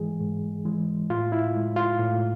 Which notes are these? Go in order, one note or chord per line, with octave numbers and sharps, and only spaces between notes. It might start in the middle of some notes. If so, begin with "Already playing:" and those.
Already playing: G#2 E3 G#3 G#4
G#2
E3 G#3
A2 F4
E4
G#3
F4
A2